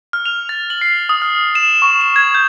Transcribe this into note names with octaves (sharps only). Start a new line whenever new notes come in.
F6
F7
A6
F#7
C7
D#6
F6
E7
C#6
E7
G#6
G6